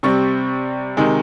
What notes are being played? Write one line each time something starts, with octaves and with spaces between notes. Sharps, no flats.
C3 G3 C4 C#6
C3 D#3 G#3